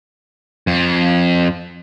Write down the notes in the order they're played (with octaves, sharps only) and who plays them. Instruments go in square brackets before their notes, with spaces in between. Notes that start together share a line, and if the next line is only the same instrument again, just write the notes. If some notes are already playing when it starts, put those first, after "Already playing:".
[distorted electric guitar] F2